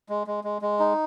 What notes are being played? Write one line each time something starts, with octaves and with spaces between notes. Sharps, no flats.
G#3
G#3
G#3
G#3
D#4